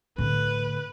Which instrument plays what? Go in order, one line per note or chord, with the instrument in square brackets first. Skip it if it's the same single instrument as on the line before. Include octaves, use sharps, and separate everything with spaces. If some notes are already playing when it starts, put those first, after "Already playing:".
[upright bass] A2 D3 [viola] B4